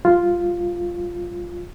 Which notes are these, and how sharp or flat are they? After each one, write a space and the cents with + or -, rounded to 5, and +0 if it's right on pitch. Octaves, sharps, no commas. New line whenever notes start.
G3 -15 F4 +0